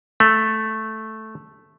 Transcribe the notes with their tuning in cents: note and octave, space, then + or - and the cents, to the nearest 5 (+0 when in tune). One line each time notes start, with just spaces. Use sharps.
A3 -5